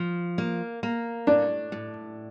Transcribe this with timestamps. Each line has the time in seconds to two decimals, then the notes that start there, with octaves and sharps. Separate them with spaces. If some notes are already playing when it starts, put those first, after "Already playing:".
Already playing: F3
0.38 A#3
0.83 A#3
1.27 A2 D4
1.72 A2